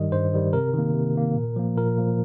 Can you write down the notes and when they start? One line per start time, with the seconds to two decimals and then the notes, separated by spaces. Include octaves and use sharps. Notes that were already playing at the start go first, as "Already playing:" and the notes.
Already playing: G2 D#3 G3 D#5
0.12 G2 C5
0.33 D#3 G3
0.53 C3 A#4
0.74 D#3 A#3
0.94 C3
1.15 D#3 A#3
1.36 A#2
1.56 F3 A#3
1.77 A#2 A#4
1.98 F3 A#3